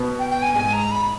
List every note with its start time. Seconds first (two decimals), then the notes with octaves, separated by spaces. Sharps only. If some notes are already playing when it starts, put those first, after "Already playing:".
Already playing: B2 B3
0.19 G5
0.30 G5
0.42 G#5
0.54 G#2 G#3 G#5
0.73 A#5
0.91 B5